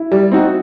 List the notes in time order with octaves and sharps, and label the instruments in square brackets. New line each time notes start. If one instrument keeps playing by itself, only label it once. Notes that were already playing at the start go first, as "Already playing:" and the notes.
Already playing: [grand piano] E4
[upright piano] G3
C4 D#4 F#4